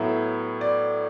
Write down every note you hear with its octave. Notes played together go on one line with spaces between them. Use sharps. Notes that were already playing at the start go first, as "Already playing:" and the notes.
Already playing: A2 F#3 B3 E4 E5
D5